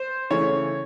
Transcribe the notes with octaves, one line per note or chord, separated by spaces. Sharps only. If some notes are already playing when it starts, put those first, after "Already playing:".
Already playing: C5
C#3 E3 A3 C#5